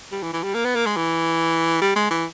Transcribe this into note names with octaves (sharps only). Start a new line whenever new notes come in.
G3
E3
E3
G3
A#3
B3
A#3
G#3
E3
G3
G#3
E3